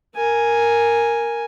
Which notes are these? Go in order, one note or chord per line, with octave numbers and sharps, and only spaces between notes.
A#4 G#5